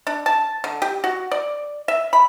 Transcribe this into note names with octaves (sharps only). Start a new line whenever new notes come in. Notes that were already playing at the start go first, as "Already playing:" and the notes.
D4
A5
D3
G4
F#4
D5
E5
B5